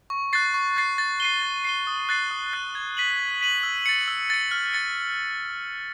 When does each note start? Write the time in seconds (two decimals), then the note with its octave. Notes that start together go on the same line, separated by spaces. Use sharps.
0.10 C#6
0.33 F#6 A6 C7
0.54 C#6
0.77 F#6 A6 C7
0.98 A6
1.20 C7 D#7 G7
1.43 A6
1.64 C7 D#7 G7
1.87 D#6
2.09 F#6 A6 C7
2.31 D#6
2.53 F#6 A6 C7
2.75 G#6
2.97 B6 D#7 F#7
3.19 G#6
3.41 B6 D#7 F#7
3.63 E6
3.86 A6 C#7
4.08 E6
4.30 A6 C#7
4.51 F6
4.74 A6 C#7